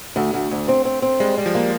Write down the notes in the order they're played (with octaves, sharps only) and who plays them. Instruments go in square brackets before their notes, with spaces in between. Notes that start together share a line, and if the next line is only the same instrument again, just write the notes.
[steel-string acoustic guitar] D2 [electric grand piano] A3
[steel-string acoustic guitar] D2
D2
C4
C4
C4
[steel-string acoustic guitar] G3 [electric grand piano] G#3
[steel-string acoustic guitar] G3
[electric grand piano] F3
[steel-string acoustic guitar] A#3